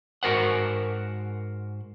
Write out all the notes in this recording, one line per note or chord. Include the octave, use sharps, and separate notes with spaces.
G#2 F#4 A#4 C5 F#5